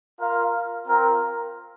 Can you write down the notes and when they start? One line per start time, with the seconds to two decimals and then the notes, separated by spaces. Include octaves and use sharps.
0.19 F4 A#4 F5
0.85 C4 F4 A#4 F5